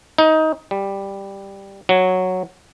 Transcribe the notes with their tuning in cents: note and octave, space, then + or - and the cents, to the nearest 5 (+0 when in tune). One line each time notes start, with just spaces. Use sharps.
D#4 +20
G3 +5
F#3 -5